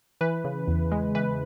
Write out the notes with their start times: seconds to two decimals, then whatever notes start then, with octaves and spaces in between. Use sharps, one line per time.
0.21 E3 B4
0.44 C#3
0.68 E2
0.92 G#3
1.15 E3 B4